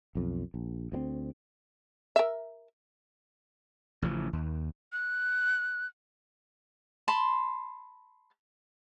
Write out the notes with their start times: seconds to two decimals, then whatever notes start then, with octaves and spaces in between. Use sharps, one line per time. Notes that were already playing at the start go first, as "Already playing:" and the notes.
0.15 B1 F2
0.54 A#1
0.92 D2 E3 C4
2.16 A#4 E5
4.02 A1 C#3 F3
4.33 D#2
4.93 F#6
7.08 A5 B5 C6